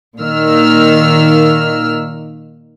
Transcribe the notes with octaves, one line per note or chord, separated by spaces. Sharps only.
A#2 D#3 A#3 E6 F6